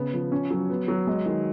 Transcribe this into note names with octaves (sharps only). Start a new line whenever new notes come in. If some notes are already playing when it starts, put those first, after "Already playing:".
Already playing: C#3 B3
F3
C#4
F#3
B3
F#3
G#3
D#3